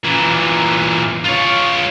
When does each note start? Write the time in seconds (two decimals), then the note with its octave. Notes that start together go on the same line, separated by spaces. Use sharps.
0.05 A#2 E3
1.25 F4 C#5